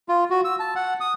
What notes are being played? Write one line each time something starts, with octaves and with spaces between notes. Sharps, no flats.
F4
F#4
E6
A5
F#5
D#6